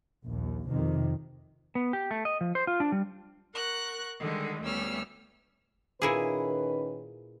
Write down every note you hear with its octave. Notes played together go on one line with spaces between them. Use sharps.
A#1 D#2
F2 C3 D#3
B3
G4
A3
D#5
F3
C5
F4
D4
G3
A#4 F#5 C#6 F#6
D3 D#3 G3 G#3
D2 G3 B3 C#4 E6 F6
A#2 D#3 C#4 E4 G#4 B4